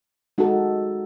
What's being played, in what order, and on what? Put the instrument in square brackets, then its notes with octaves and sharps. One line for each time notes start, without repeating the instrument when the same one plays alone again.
[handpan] G#3 D#4 F#4 A4